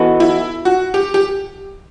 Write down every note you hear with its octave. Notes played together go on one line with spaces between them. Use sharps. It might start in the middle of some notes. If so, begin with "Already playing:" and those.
Already playing: E3 B3 F#4 A4 D#5
E4
F#4
G4
G4